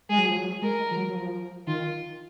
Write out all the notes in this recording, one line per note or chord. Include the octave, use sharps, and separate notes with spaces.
G#3 G#4
F#3
F3
F#3
G#3 A#4
G#3
F3
F#3
F#3
F3
D#3 F4